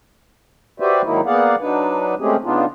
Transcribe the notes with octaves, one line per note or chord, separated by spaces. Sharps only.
F#4 G4 B4 C5 D5 E5
G#2 D#3 F#3 A#3 D#4 E4
A#3 B3 G#4 D5 F5 F#5
F#3 D4 D#4 B4
G#3 A3 C4 C#4 G4 G#4
C#3 B3 D4 D#4 F4